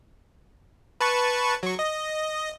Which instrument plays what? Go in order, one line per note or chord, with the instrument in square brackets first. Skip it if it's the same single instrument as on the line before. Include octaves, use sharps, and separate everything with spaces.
[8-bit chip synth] B4 A5 C#6
F#3 C#6
D#5